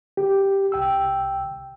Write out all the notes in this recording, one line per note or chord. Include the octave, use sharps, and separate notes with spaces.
G4
C2 G5 E6